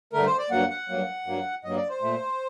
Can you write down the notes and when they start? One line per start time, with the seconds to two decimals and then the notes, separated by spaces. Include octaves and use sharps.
0.13 G2 D3 A3 A#4
0.25 C5
0.38 D5
0.50 G2 F#3 A#3 F#5
0.70 F#5
0.89 G2 F#3 A#3
1.26 G2 F#3 A#3
1.64 G2 F#3 A#3 D#5
1.77 D5
1.89 C5
2.02 A#2 A3